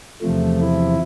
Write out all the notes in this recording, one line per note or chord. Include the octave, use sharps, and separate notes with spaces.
E2 C3 F3 A3
E4